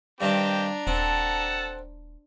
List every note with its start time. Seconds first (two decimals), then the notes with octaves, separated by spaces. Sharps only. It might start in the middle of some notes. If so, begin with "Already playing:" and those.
0.21 G2 D#3 C4 D4 G4 A#5
0.87 D#1 C4 A4 F#5 A5